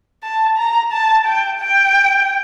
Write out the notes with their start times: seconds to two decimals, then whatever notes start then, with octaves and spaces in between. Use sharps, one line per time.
0.23 A5
0.57 A#5
0.92 A5
1.26 G5
1.60 G5